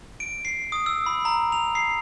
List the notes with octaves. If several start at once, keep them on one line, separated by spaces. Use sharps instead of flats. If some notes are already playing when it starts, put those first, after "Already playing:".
D7
C7
D#6
E6
B5
A#5
F7
C7